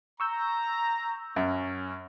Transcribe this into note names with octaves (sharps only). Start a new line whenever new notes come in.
A#5 C#6 E6 G6
F#2 C#4